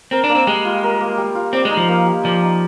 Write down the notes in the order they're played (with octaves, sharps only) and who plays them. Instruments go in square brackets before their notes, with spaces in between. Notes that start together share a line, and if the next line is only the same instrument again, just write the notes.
[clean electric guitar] C4 [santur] A#4
[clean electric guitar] D4
[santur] A#3
[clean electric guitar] C4
[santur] G3 [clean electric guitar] G#3
[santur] F4
A#4
A#3
G3
F4
[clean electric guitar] C4 [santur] D5
[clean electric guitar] G#3
[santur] D#4
[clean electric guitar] F3
[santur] A#3
G4
[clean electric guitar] F3 [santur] D5
[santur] D#4